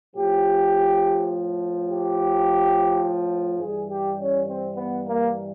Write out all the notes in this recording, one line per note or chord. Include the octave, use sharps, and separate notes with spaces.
A2 F3 G4
G4
G2 E3 G3 G#4
G4
C#4
C4
B3
A#3